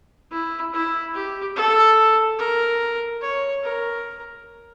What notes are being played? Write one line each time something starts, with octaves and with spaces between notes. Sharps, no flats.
E4
E4
G4
A4
A#4
C#5
A#4